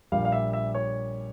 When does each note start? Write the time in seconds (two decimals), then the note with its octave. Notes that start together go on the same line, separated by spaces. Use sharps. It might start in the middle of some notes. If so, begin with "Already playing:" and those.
0.12 A#1 A#2 G3 F5
0.25 F5
0.32 E5
0.53 E5
0.75 C#5